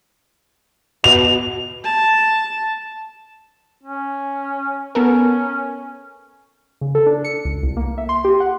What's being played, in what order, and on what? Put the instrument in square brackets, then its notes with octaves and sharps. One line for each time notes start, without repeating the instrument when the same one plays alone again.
[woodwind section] B2 [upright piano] F7
[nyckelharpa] A5
[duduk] C#4
[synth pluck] B3 A4 A#4 [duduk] C#4
[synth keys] C#3
A4
D4
C#7
C#2
C2
A#3
E5
C6
G4
F#5